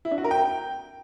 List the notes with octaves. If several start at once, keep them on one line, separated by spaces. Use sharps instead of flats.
E4
D4
F#4
A#4
G5